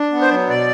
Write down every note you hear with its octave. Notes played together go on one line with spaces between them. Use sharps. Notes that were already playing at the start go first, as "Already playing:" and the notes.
Already playing: D4
B3
C5
F#3
B2 D5